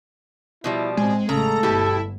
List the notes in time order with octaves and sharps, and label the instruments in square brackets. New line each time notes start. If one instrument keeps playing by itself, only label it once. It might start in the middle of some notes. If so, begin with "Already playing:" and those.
[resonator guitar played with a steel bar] B2 F3 G3 [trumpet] E4
[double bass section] A2 C4 [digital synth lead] G#3 [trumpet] G#5
[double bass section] A1 G#3 A3 [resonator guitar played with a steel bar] C#3 [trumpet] A4 [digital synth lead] A#5
[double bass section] G1 [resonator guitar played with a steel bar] B2 G4 [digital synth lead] E4